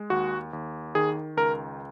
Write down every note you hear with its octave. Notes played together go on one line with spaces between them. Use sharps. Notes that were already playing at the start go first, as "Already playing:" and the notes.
Already playing: G#3
D#2 F#4
D#2
D#3 G#4
C#2 A#4